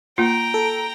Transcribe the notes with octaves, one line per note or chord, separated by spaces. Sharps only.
A#3 F4 G5 A#5
A4